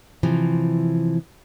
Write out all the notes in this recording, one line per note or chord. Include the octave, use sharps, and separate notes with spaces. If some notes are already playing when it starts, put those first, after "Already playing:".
C3 E3 F3